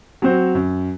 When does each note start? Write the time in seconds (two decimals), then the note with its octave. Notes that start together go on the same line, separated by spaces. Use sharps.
0.22 F#3 C4 F#4 C5
0.55 F#2